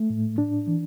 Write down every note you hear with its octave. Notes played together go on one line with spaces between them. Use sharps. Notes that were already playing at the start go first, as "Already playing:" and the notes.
Already playing: A3
A2
D4
E3